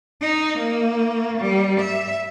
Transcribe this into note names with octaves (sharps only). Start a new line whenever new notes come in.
D#4
A#3
G3
E5